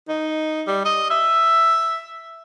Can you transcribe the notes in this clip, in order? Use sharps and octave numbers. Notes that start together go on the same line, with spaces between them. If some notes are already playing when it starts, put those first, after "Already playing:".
D#4
G3
D#5
E5